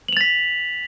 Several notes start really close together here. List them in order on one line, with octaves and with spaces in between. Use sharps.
F#7 F7 A6 B6